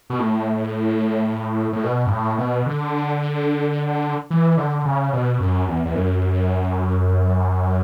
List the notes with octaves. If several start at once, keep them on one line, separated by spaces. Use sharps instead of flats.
B2
A2
A2
B2
G2
A2
B2
D3
E3
D3
C#3
B2
F#2
E2
E2
F#2